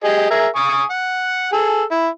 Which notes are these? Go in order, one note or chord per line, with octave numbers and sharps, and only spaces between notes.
G4 G#4 D#5
G#4 A#4 E5
G#5 C#6 D#6
F#5
G#4 A4
E4